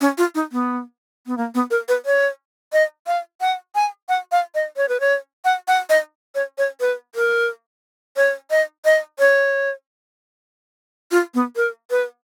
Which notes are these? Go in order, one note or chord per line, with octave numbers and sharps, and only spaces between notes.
C#4
F4
D#4
B3
B3
A#3
B3
A#4
B4
C#5
D#5
F5
F#5
G#5
F#5
F5
D#5
C#5
B4
C#5
F#5
F#5
D#5
C#5
C#5
B4
A#4
C#5
D#5
D#5
C#5
F4
B3
A#4
B4